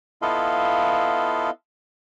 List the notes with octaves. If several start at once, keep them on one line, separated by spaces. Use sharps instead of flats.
B3 E4 F4 A4 D#5 F5